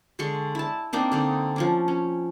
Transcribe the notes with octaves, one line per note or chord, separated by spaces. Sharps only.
D3 G#3 C6 C#6
E4 A5
A#3 C4 D4 D#4
D3 C4 D#4
F3 C#4 D4
C#4